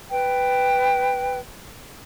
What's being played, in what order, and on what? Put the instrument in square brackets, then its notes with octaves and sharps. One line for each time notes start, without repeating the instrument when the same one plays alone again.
[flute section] B4 G5